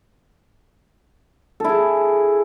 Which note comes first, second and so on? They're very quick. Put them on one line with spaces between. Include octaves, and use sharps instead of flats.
A4 E4 G#4